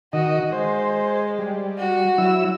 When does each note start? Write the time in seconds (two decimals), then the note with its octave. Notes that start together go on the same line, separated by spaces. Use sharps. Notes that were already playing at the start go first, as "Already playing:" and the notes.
0.13 D#3 F#4 D#5
0.52 G#3 C5
1.39 G3
1.78 F#4
2.18 F#3 E4 E6